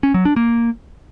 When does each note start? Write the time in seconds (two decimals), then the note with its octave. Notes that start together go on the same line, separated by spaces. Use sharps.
0.03 C#4
0.14 F#3
0.25 D4
0.36 A#3